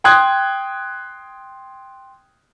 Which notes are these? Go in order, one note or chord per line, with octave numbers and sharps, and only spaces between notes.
G5 C6 D#6 F#6 G#6